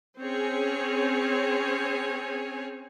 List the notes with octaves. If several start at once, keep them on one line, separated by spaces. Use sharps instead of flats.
C4 C#4 G#4 C#5 G#5